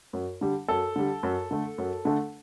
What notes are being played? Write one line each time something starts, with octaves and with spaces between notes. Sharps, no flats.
F#2
D3 G3
F#2 A4
D3 G3
F#2
D3 A3
F#2
D3 A3